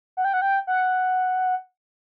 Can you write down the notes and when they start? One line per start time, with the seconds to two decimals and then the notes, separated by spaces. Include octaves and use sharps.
0.17 F#5
0.25 G5
0.34 F#5
0.42 G5
0.67 F#5